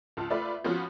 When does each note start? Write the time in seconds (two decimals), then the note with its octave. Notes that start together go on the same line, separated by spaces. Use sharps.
0.17 C#2 F4 A5
0.30 A3 F4 B4 D5 E5
0.64 F3 B3 C#4 F4 F#4